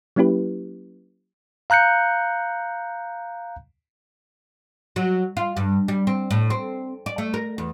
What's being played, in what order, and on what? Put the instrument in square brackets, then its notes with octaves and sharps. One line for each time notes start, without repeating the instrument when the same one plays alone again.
[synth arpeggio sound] F#3 A#3 C#4 E4 G4 B4
[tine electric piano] F5 A#5 F#6 G6 C#7
[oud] F#3
F4
G2
G3
C4
A2
C4
D5
A3
A#4
E2